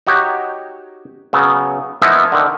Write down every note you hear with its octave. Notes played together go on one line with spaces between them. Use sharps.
D#4 F#4 G4 C#5
C#3 F#3 B3
E3 F3 A#3 B3 D#4 E4
D3 D#3